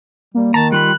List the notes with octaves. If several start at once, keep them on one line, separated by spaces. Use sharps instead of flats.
G3 A#3
D#3 A5 A#5
G3 F4 B5 F#6